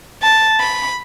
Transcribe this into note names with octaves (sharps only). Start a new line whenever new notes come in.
A5
B5